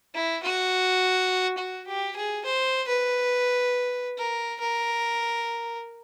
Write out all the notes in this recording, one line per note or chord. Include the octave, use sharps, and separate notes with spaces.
E4
F#4
F#4
G4
G#4
C5
B4
A#4
A#4